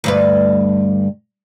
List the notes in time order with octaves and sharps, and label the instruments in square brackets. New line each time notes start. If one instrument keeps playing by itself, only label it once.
[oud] D2 G2 B4